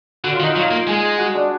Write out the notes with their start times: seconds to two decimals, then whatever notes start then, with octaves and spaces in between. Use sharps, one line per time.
0.24 D3 F#4
0.34 F4
0.40 D#3
0.43 D#4
0.52 F#3 F4
0.71 A#3
0.87 G#3 G#4
1.18 F#4
1.35 D4